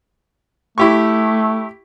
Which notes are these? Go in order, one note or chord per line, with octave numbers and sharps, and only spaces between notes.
A3 E4 G4 C#6